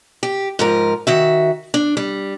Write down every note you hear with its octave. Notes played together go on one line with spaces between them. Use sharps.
G4
G#2 F3 A#4
D#3 F#4 E5
D4
G3